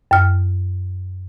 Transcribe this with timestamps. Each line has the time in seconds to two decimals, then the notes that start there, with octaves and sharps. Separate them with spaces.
0.11 F#2 F6